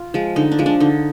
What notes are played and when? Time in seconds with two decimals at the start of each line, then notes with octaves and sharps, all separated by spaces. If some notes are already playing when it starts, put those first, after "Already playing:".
Already playing: F4
0.14 F3 G#3
0.36 D3 D#4
0.52 D4
0.59 F3 G#3
0.66 D4
0.80 D3 D#4